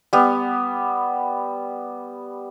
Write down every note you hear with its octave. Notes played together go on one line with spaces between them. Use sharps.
G3 B3